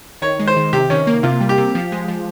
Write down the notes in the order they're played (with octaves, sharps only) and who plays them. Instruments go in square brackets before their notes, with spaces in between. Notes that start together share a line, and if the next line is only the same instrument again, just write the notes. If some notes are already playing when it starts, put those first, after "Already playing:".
[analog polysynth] D#3 [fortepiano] C#5
[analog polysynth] G#3
[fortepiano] C5
[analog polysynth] D#3
[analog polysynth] C3 [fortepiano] G4
[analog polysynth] D#3 [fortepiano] C#4
[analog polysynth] A#3
[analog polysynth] C3 [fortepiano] F4
[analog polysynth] G3
[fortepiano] G4
[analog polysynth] C3
F3
G#3
F3